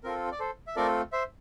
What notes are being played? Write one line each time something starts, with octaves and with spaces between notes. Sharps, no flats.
C4 F4 A4 A#4
D5
A4 C5
E5
A3 C4 F4 A4 A#4 D5
C5 E5